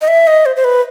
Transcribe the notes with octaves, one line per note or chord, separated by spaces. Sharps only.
D#5
E5
D#5
C5
C5
B4